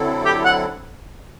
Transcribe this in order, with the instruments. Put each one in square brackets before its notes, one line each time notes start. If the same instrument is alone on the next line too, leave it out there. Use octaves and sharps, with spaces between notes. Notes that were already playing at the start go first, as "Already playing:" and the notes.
Already playing: [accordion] D3 F#3 C4 E4 A4
[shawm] G4
F#5